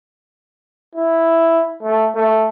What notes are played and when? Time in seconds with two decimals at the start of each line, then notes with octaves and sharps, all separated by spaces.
0.95 E4
1.83 A3
2.15 A3